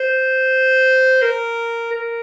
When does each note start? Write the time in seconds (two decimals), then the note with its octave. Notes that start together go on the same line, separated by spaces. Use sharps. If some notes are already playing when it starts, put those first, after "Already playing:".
Already playing: C5
1.22 A#4
1.92 A#4